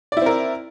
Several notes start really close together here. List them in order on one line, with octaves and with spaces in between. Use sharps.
D5 E4 C4 A#4